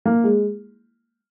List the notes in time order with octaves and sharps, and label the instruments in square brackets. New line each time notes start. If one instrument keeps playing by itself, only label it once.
[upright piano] A#3
G#3